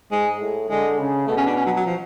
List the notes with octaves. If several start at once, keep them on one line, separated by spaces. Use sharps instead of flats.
G#2 G#3
A2
D3 G#3
C#3
B2 A3
C#4
D4
C#4
F#3
F#3
F3